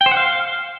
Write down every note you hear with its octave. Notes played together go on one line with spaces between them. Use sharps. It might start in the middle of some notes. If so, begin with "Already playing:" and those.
G5
C5
F#5
F5